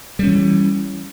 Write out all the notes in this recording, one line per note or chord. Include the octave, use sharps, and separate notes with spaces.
E3 G3 C#4